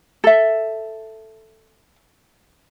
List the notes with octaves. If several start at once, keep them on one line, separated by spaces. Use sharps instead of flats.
A4 E5